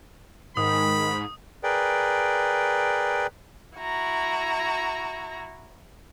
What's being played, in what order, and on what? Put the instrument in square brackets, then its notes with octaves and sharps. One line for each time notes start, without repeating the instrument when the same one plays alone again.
[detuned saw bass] G#2 [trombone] D#3 [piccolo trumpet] B5 [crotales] D#6
[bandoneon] G#4 A#4 B4 D5 G5
[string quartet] E4 F#4 A#5